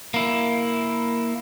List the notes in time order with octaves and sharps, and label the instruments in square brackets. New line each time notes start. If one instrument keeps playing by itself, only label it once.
[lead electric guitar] A#3 E4